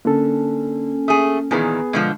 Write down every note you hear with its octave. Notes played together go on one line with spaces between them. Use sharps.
D3 A#3 C#4 A4
A3 G#4 D#6
A#2 D#3 E3 B3 G#4
B2 D3 F3 G#3